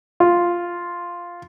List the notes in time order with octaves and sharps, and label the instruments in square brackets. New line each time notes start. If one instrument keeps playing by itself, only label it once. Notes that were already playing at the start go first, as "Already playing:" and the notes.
[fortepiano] F4